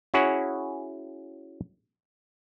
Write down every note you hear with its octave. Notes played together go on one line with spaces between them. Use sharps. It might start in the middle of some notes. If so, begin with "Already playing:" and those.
C#4 E4 F#4 G#4 C#5 F#5